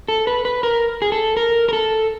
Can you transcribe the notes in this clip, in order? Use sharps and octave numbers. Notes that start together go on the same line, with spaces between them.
A4
B4
B4
A#4
G#4
A4
A#4
A#4
A4